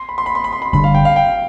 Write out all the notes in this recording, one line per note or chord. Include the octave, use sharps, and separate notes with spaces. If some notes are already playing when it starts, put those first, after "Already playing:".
Already playing: C6
B5
C6
B5
C6
B5
C6
B5
G1 G2 D3 G3 B5
F5
G5
F5
G5